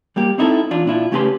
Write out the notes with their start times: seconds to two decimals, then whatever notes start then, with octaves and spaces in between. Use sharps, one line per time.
0.16 G3 A#3 G4
0.38 C4 D#4 E4 F#4 A4
0.71 E2 D4 F4
0.86 A#2 D4 E4 F4
1.11 C#3 A3 C#4 G4 B4 C6